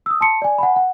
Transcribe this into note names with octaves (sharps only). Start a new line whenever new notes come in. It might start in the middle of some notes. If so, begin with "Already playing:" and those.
D#6 E6
A5 C6 C#7
D5 G#5
F#5 G#5 B5
F#5